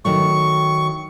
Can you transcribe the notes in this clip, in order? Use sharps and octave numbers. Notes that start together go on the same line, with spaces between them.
D#3 F#3 A3 C#6